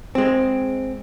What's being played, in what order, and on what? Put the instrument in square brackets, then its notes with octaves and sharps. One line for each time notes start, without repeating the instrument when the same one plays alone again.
[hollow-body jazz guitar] G#3 C4